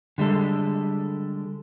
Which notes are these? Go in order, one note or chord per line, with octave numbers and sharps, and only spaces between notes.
D3 G3 G#3 A4